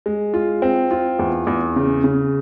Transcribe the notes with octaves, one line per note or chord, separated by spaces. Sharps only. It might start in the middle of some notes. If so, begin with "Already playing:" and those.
G#3
F4
C4
F4
E2
E2
C#3
C#3